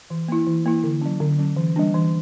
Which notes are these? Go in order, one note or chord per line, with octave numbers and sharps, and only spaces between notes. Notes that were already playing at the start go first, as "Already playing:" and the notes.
E3
A#3 E4
E3
A#3 E4
D3
F#3 C#4
D3
F#3 C#4
E3
G3 A#3 D4
E3